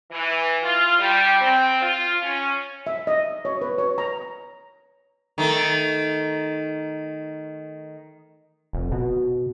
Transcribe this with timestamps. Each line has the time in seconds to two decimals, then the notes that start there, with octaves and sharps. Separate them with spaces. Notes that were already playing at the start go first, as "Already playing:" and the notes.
0.11 E3
0.63 F4
1.00 G3
1.41 C4
1.83 F4
2.21 C#4
2.87 E5
3.07 D#5
3.45 C#5
3.61 B4
3.78 C#5
3.98 A#5
5.38 D#3 A3
8.73 F1
8.92 B2